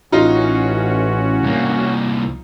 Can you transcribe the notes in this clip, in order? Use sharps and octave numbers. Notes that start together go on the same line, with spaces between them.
A1 C#4 D#4 F4 F#4
C2 A#3